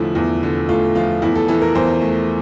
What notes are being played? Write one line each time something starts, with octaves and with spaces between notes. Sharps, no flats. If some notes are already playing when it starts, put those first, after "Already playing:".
Already playing: E2 D3 F3 A3 E4
E2
D3
A3 F4
F3 F4
E2 E4
A4
E3 A4
A#4
E2 C5
A3